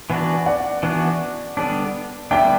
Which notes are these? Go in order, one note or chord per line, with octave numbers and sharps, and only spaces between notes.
E3 B3 D4 F#4
D5 F#5
E3 B3 D4 F#4
D3 G3 B3 D4
D3 G3 B3 D4 E5 G5